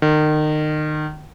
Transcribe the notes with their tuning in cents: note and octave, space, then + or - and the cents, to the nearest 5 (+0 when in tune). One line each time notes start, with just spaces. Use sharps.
D#3 -30